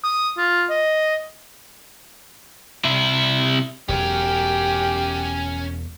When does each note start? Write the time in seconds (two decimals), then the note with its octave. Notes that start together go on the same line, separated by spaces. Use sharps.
0.04 D#6
0.38 F4
0.70 D#5
2.85 C3 E4
3.89 E1 E2 C#4 G4 A#4